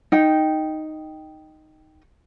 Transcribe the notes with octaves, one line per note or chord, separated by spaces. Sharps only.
D#4 G5